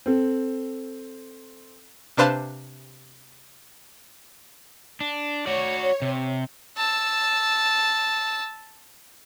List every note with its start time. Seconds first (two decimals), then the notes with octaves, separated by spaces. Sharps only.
0.06 C4 A4
2.17 C3 D4 B4 C5 F5 A5
5.01 D4
5.46 F#4 C#5 D5
6.02 C3
6.77 A5 E6